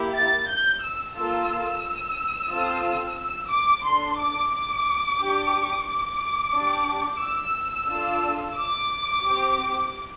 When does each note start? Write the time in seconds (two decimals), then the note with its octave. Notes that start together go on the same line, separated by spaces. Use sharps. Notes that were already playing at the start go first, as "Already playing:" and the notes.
Already playing: A#3 E4 G4
0.14 A6
0.48 G6
0.82 E6
1.15 A#3 F4 A4 E6
2.50 C4 F4 A4
3.18 E6
3.51 D6
3.85 D4 A4 C6
4.18 D6
4.52 D6
5.19 D4 G4
5.87 D6
6.54 D4 G4
7.21 E6
7.89 D4 F4 A4
8.56 D6
9.23 C4 G4